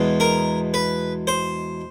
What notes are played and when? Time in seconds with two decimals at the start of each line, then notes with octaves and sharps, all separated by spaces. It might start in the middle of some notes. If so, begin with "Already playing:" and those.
Already playing: E2 B2 G#3
0.20 A#4
0.74 B4
1.27 C5